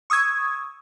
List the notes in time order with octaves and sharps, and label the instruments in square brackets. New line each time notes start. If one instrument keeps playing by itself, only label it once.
[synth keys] C#6 D#6 E6 G#6